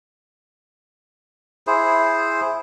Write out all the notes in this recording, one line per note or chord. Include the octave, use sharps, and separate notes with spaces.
E4 G#4 C5